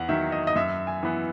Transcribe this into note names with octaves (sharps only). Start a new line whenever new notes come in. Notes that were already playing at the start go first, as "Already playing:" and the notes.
Already playing: E2 F#5
D#3 F#3 E5
D#5
D#5
F#2 E5
G#5
E3 B3